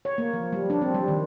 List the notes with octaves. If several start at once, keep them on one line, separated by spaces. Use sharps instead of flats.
C#5
A#3
F3
G3
D4
C4
G3
D#3